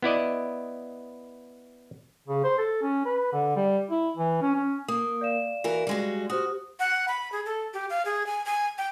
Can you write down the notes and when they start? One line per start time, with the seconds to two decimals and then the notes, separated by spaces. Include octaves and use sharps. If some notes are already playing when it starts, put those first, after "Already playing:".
0.02 B3 E4 D5 D#5
2.28 C#3
2.44 C5
2.58 A4
2.82 C#4
3.06 B4
3.33 D3
3.56 G3
3.91 E4
4.17 E3
4.42 C#4
4.55 C#4
4.88 A#3 D#6
5.21 D5 F5 E7
5.64 E3 F#4 A#4
5.87 G3 G#3 F#4
6.30 F#4 G4 C5 D#6
6.79 F#5
7.08 B5
7.32 G#4
7.46 A4
7.74 G4
7.90 F5
8.05 G#4
8.26 G#5
8.45 G#5
8.78 G5